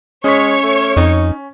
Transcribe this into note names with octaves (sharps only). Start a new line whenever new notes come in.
G#3 C#4 C#5 B6
A3
F2 D#4